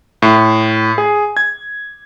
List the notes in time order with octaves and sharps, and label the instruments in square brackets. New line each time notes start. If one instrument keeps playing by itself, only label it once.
[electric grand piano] A2
G#4
G#6